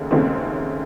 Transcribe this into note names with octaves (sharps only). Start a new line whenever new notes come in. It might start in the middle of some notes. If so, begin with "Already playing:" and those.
Already playing: D#2 C#3 A3
D#2 C#3 A3 C4